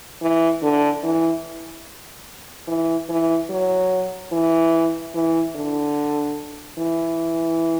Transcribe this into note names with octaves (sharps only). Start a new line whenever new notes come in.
E3
D3
E3
E3
E3
F#3
E3
E3
D3
E3